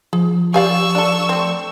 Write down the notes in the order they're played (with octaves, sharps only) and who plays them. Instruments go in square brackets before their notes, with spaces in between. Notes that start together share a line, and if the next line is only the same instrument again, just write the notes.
[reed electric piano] F3 [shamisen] G#4
[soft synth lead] G4 [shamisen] D5 F5 G#5 [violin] C#6 E6
[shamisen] D4 A4 [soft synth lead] D5
[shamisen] A3 C4